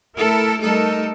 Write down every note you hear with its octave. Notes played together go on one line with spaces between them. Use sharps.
A3 E4 A4 A#4
G3 A3 D#4 A4 A#4